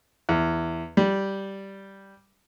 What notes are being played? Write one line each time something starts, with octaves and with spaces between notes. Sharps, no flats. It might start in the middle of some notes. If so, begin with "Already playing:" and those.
E2
G3